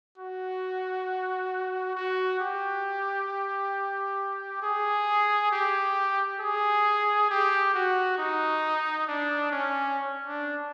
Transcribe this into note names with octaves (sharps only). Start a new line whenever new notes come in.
F#4
F#4
G4
G#4
G4
G#4
G4
F#4
D#4
D4
C#4
D4